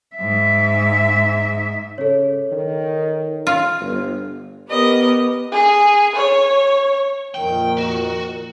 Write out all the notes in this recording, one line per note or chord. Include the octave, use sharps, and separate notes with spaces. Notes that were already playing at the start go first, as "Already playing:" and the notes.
G#2 E5
C#3 A4 C#5
D#3
F4
G1
B3 G4 A#4 B4 D#5
G#4
C#5
F2 A#2 D#3 G5
F#4